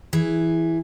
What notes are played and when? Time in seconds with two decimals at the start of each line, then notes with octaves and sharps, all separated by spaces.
0.13 E3 G#4